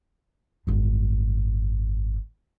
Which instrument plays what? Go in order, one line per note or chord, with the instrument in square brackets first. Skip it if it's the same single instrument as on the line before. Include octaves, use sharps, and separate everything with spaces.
[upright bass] G#1 F#2